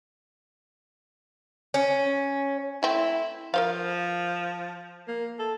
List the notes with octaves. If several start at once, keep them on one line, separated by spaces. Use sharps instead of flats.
C#4
A3 C4 E4
F3 A#4 C5 F5
A#3
A4